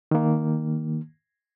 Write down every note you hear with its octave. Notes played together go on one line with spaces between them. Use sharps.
D#3 A#3